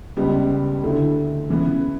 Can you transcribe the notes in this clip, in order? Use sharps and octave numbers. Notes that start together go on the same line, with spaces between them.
C#2 C#3 G3 B3
D2 D3 A3 E4
C#3 E3 B3